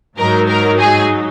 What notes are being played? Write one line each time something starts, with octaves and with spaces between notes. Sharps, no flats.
G#2 F#3 D#4 A#4
A#4
G#4